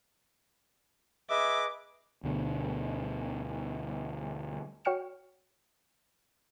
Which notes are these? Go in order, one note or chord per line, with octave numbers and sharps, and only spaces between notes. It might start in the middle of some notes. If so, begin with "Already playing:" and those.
G#4 B4 D#5 E5 D6
D2 B2 D3
F#4 C#5 G5 F6 C#7 E7